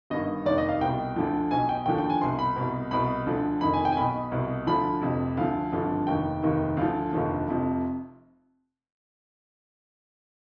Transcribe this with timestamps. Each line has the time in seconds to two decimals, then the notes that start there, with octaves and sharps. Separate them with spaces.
0.10 G1 G2 D#3 D#5
0.46 F1 D#2 D#3 D5
0.58 D#5
0.69 F5
0.81 C2 B2 G5
1.16 D2 D3 F3
1.51 B1 B2 G#5
1.69 G5
1.86 D#2 D3 F3 G5
1.98 G5
2.10 G#5
2.21 C2 B2 C6
2.39 B5
2.56 C2 B2
2.91 C2 B2 B5
3.27 D2 D3 F3
3.61 F1 F2 D#3 B5
3.74 G#5
3.85 G5
3.92 G#5
3.97 B1 B2 B5
4.32 C2 B2
4.67 D2 D3 F3 B5
5.01 F1 F2 C3
5.37 D2 D3 F3 F5
5.72 G#1 G2 D3 F3
6.07 F1 D#2 D#3 G5
6.43 F1 D#2 D#3
6.77 D2 D3 F3 F5
7.13 F1 D#2 D3 F3
7.48 F1 F2 C3 F3